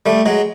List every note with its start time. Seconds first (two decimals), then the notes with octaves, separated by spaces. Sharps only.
0.06 G3 A3
0.26 F#3 G#3